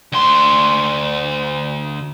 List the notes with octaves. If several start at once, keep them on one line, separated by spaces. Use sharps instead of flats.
D2 C6